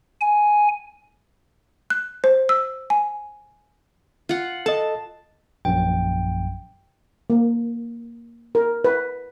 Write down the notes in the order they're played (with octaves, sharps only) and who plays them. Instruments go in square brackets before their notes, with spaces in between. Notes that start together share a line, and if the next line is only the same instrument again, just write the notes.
[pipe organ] G#5
[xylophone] F#6
C5
E6
G#5
[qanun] F4 F#5
[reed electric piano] A4 D#5 [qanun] A5
[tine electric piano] A#1 F#2 [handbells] G5
[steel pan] A#3
A#4
B4